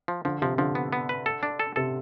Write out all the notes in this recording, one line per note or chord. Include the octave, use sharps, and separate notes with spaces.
F3
D3 F3
C3 F3
D3 F3
B3
B3
B4
A4
D4
A4
C3 A4